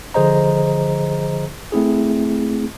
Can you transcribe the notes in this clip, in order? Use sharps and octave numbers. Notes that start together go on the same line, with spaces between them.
D3 F3 G#4 C5 D#5 A#5
A3 C4 E4 G#4